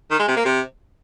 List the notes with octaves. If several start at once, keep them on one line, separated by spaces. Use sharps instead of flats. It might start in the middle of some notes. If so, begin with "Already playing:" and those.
D#3
G#3
C3
A#3
C3